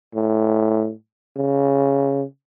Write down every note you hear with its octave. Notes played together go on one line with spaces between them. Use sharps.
A2
C#3